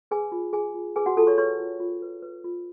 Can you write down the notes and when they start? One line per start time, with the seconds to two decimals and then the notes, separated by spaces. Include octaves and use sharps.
0.11 G#4 B4 G#5
0.32 F4
0.53 G#4 G#5
0.75 F4
0.96 G#4 B4 G#5
1.06 F#4 F#5
1.17 F4 A4 A5
1.27 C#5 C#6
1.38 B4 C#5 C#6
1.60 F4
1.80 F4
2.02 B4
2.22 B4
2.44 F4